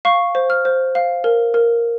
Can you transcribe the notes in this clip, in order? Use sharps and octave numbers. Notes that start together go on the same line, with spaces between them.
F5 C#6
C5
F6
C5
F5
A#4
A#4